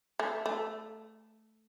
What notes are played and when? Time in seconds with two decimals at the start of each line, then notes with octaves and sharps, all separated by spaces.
0.19 A3
0.46 A3